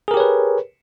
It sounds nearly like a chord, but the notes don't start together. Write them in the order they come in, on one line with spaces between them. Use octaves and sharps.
G#4 A#4 G4 C#5 B4